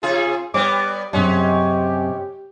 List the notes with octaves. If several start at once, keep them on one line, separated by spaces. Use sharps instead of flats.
C3 F4 G#4
G3 B3 C#5 D6
F#2 C3 G#3 C#4 G4